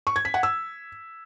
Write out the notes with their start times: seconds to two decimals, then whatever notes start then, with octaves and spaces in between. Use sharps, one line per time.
0.07 C#6
0.16 G#6
0.25 B6
0.34 F#5
0.43 E6